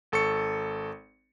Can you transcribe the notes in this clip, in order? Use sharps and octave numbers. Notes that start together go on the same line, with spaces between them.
G#1 A4 C#6 C#7